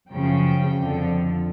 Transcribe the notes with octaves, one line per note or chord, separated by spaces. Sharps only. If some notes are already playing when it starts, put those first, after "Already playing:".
F#2 C#3 F3 G5
F2 D3 F3